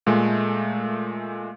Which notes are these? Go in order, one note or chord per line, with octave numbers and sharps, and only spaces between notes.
A#2 G#3 A3